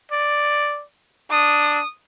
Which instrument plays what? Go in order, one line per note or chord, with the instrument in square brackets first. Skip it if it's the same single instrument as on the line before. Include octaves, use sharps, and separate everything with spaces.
[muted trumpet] D5
[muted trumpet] D4 [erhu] D#6